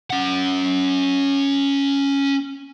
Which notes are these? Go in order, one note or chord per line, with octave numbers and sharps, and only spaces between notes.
C#4 F#5